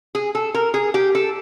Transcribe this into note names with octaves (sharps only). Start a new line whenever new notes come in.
G#4
A4
A#4
G#4
G4
A4